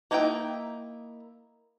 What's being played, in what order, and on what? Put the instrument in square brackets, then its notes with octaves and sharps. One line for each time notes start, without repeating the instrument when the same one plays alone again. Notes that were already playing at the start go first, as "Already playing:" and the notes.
[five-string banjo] A#3 D#4 E4 F#4 G5